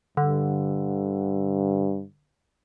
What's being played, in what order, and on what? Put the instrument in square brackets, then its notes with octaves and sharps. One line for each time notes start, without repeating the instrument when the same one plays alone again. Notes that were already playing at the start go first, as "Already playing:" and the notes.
[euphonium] G2 [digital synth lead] D3